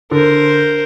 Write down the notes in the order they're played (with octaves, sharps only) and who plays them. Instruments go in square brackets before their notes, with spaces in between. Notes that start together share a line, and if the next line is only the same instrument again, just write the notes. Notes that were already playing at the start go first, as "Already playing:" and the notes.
[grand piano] D3 [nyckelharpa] A#4 C5